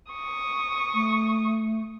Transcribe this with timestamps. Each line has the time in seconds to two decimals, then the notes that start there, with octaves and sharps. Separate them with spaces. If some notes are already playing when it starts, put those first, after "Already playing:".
0.12 C#6 D#6
0.94 A3